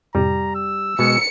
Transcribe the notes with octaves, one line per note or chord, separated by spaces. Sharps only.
F2 A2 C3 G3 A#5
E6
B2 G#3 C#7